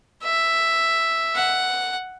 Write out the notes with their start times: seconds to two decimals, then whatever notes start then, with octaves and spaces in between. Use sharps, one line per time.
0.23 E5
1.36 F#5